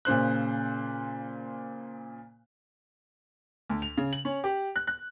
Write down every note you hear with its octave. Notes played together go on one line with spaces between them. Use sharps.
A#2 C#3 C5 F#6
D2
F7
C#3
F#7
C#4
G4
F#6
F#6